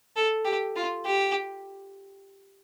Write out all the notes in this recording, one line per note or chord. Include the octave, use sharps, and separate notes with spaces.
A4
G4
F4
G4